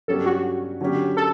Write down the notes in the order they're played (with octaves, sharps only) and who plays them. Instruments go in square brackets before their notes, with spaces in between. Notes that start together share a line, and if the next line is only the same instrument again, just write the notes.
[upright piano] G2 F#3 C#4 G4 [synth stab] A4
[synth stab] F#4
[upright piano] D3 F#3 C#4 G4
[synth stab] A4